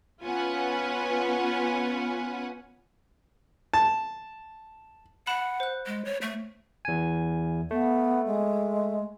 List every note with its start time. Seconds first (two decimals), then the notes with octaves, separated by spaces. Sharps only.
0.24 B3 C#4 F4 B4 F#5 G#5
3.74 A5
5.27 F#5 B5 F#6 E7
5.60 C5 F#6
5.86 G#3
6.05 C#5
6.22 A3
6.85 E2 G#5
7.71 A3 B3
8.26 G#3